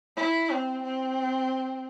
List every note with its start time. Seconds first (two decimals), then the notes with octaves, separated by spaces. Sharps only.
0.16 E4
0.50 C4
0.83 C4